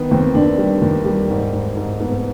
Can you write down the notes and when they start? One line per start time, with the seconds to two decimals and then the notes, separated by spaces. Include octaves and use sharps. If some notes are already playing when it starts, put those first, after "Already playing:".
Already playing: D#3 B3
0.11 D#2 C4
0.35 D#2 D4
0.58 G3
0.82 D#2
1.05 G3
1.30 G#2
1.53 G#2
1.77 G#2
2.00 G#2 B3